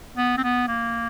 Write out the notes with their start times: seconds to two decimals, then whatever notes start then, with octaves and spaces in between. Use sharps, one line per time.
0.17 B3
0.37 C4
0.44 B3
0.68 A#3